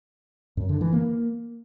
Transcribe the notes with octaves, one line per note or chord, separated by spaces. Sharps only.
F#2
D3
E3
A#3